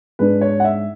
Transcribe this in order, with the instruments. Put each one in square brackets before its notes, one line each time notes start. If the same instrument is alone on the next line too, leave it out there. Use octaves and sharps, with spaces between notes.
[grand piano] G#2 G#3 D4 B4
C#5
F#5
E5